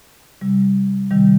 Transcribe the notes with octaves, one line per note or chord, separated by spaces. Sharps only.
C3 G3
C3 D#3 G3